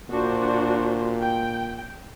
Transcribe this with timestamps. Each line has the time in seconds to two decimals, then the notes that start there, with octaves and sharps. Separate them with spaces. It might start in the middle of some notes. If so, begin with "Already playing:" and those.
0.10 A#2 D4 F#4 C5
1.21 G5